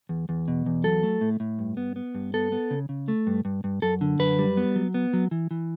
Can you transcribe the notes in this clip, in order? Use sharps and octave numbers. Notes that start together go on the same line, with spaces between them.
E2
E2
B2
E2
F#3 A4
A3
A2
A2
G2
B3
B3
G2
B3 A4
B3
C#3
C#3
A3
G2
G2
G2
F#2 A4
D3
F#2 B4
G3
B3
F#3
B3
F#3
E3
E3